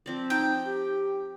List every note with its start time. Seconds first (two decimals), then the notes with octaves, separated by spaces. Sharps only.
0.06 F3 C4 D5
0.30 D#4 G5
0.66 G4